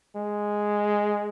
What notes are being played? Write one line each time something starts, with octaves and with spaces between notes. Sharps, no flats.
G#3